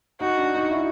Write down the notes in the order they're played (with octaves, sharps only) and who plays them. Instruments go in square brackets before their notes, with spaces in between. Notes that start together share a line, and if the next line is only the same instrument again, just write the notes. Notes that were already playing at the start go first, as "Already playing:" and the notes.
[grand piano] D#4 [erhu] F#4
[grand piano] D4
D#4
E4